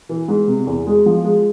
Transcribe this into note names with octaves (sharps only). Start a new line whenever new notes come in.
E3
G#2
C3
E2
G#3
F3
G#3